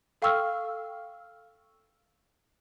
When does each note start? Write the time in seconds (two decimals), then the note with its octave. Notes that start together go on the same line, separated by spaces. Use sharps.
0.22 A4 F5 G5 C#6 E6 F6